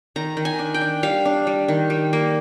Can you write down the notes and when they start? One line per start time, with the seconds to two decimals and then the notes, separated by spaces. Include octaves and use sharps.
0.16 D#3 A#5
0.37 D#3
0.45 G#5
0.59 D4
0.74 G5
0.81 D4
1.03 G3 F5
1.25 D4
1.47 G3
1.68 D#3
1.90 G3
2.13 A#3